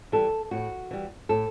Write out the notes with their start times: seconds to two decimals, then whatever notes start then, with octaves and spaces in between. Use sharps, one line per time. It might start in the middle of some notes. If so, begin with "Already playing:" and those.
0.12 E3 G3 A4
0.51 A2 F#4
0.91 E3 G3
1.29 A2 A4